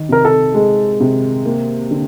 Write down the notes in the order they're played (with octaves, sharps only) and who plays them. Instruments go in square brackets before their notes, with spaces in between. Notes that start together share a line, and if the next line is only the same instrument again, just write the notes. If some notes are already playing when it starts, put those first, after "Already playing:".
Already playing: [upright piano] D#3
[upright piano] C3 [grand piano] A#4
[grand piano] A4
[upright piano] G#3
C3
A#3
D3